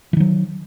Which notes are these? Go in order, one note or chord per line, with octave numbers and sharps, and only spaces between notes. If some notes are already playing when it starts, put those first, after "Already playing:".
D#3 E3 F#3